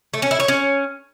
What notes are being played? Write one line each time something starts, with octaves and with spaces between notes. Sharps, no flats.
A3
C#4
E4
C#5
C#4